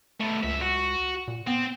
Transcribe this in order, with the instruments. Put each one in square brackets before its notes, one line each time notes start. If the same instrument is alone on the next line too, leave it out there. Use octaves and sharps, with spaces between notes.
[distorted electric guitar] A3 B3
[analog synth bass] C#2 [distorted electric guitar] F#2 E5
[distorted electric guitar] F#4
[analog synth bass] A#2
[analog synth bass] B3 [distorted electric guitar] C4